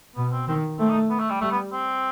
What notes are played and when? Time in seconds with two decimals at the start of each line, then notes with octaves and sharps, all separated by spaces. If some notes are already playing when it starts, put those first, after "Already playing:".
0.15 B2 B3
0.32 C4
0.47 D#3 C4
0.78 A3 C4
0.89 D#4
1.10 B3
1.20 A3
1.30 G3
1.41 G3 A3
1.51 B3
1.72 C4